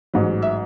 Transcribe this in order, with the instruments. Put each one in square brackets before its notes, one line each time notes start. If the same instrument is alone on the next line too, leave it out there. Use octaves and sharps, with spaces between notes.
[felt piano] A1 G#2 F#3
E5